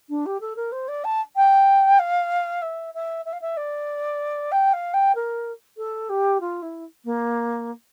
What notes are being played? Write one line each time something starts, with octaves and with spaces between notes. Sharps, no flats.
D4
G4
A4
A#4
C5
D5
A5
G5
F5
E5
E5
E5
F5
E5
D5
G5
F5
G5
A#4
A4
G4
F4
E4
A#3